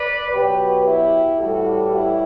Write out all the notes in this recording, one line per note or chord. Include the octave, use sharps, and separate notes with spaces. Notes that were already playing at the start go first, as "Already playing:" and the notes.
Already playing: B4 D5
B2 F#3 G4 B4
E4 G4
A2 E3 G3 F#4 A4
E4 G4